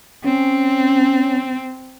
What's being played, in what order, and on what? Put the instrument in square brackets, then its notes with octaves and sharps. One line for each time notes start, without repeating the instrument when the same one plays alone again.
[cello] C4 [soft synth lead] C#4